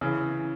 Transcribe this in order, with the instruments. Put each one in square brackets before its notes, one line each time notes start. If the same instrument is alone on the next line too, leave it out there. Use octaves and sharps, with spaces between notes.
[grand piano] C#3 [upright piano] E3